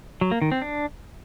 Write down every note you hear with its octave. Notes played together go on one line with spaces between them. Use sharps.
F#3
A#3
D#3
C4
D4